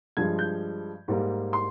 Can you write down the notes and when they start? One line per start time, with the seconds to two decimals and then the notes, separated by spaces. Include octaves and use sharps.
0.17 G2 F3 G#3 G#6
0.39 G6
1.08 G#2 G3 A#3
1.53 C6